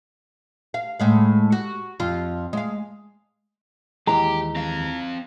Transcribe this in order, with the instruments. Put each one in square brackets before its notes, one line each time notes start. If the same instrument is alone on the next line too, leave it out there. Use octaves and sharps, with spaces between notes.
[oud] F5
A2 G#3 F5
F#4
F2 F4
G#3 F5
[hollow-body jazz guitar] D#2 E3 G#3 [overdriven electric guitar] G4 [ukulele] A#5
[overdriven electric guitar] C4 F5